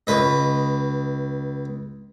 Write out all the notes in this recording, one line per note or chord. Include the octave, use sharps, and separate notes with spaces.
C#2 B4 D#5